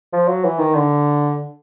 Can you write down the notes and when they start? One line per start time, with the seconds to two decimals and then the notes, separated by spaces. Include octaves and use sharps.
0.13 F3
0.28 F#3
0.45 E3
0.59 D#3
0.75 D3